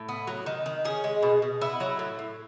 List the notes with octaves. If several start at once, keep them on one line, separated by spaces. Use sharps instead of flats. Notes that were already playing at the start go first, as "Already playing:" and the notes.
Already playing: A2
B3
F#3
D#3
D#3
C#4 G#4
G#3
B2
B2
B3 E4
F#3
A2
A2